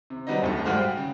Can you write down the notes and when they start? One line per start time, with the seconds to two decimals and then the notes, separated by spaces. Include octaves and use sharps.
0.10 C3
0.27 F#3 G3 B3 C4 D#4 D#5
0.42 D1 D2 A4
0.65 G2 G3 G#3 F#4 C5 F6
0.77 G5
0.97 C#3